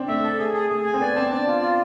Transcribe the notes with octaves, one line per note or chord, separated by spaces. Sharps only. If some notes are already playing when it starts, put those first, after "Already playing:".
Already playing: C4 D4
A3 E5
A4
G#4
G#4
A3 G#4
G#5
C4
B3 D5
C4 A5
D4 D5
F4
F4